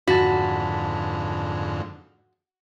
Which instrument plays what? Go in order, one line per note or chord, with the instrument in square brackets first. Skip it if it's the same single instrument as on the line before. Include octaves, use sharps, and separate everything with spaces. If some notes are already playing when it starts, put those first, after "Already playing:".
[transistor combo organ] F2 G#2 D3 [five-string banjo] F#4 [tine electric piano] A5 B5